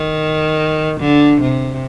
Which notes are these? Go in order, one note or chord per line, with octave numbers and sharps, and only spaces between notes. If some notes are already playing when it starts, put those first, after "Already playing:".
Already playing: D#3
D3
C3